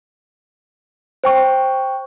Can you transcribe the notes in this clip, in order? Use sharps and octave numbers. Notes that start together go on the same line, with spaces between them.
C5 G5 C#6